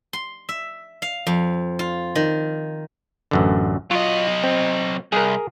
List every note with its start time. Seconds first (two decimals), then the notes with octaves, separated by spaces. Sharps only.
0.13 C6
0.49 E5
1.02 F5
1.27 F2
1.79 F4
2.15 D#3
3.31 A1 F#2 D3
3.91 F#3 F4 D#5
4.44 C4
5.12 C2 G#4 A#4